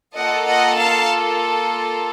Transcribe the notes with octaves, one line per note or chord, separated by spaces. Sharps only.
A#3 F4 A4 D#5 F#5
D#5 F#5
F5 A5